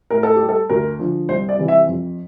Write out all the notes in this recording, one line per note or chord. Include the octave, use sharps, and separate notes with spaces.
A2 A#4
A4
G3 G4
A4
D2 A#4
D3 F3
C2 C5
D5
C3 E3 G3
E5
F2